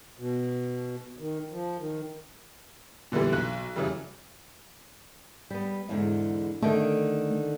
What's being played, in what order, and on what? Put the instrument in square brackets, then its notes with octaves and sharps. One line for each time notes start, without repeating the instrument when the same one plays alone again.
[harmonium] B2
D#3
F3
D#3
[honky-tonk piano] A#2 D3 E3 G3 B3
B1 F#6
F#2 C#3 E3 G3
[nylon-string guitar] G3 B3
E2 G#2 D3
[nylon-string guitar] D3 D#3 [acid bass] A3